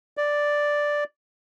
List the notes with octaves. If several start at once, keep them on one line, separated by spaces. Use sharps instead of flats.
D5